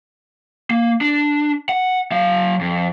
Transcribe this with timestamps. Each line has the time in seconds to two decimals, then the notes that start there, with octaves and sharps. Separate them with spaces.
0.71 A#3
1.01 D4
1.69 F#5
2.12 F#3 F5
2.61 F2